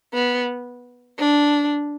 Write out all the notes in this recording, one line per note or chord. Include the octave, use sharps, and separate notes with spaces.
B3
D4